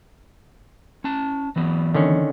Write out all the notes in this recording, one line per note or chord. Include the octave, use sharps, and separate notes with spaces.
C#4 A5
E3 F#3 B3
D3 D#3 C#4